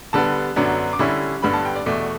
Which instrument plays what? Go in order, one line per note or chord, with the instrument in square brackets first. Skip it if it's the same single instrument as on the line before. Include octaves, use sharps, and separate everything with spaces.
[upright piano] D3 G3 B3 A5
F#2 D3 F#3 B3 D4
D6
D3 G3 C#4 E4 C#6
G2 D3 G3 B3 B5
A5
G5
D5
E2 B2 A3 D5